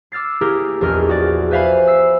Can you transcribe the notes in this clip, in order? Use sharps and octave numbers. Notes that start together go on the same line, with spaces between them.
D6 E6 F6 A6 C7
A#3 E4 G4 G#4 A#4
A#1 E2 A#4 D#5 F6
F#4 D5
B4 C5 E5 F5 G#5 B5
E6 C7